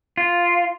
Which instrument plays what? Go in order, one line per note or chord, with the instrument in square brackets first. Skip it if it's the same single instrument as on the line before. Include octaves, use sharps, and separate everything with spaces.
[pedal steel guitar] F4